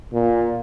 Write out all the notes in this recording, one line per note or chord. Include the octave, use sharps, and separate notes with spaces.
A#2